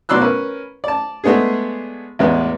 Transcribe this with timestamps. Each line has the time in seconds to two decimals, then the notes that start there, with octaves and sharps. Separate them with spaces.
0.09 B2 F#3 D5 C6 E6 F#6
0.21 C#4 A#4 B4
0.84 D5 A5
1.24 G#3 A3 B3 D4 G#4
2.19 A1 E2 G#3 B3